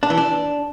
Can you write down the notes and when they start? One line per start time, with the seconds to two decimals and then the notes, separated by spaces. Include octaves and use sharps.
0.03 D4
0.10 E3
0.17 D4